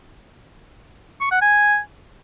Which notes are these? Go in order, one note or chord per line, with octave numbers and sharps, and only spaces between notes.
C#6
F#5
G#5